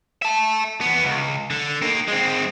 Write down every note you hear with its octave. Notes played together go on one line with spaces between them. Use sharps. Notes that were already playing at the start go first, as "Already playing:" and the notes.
E5 A5
E2 B3
C#2
D3
A#3 D#4
G#3 C4